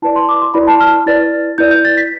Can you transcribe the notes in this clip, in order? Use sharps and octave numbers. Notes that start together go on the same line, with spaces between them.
E4 B4 D5 A5
C6
D6
C6
E4 B4 D5 B5
A5
F6
E4 B4 D5 A6
E4 B4 D5 G6
G6
A6
B6